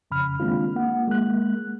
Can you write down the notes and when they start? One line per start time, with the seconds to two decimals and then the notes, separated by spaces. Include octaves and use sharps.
0.11 F2 C#3 B5 F6
0.40 D#3 G#3 A#3 C4 D4 F4
0.75 A#3 F#5
1.08 G#3 A#3 F#6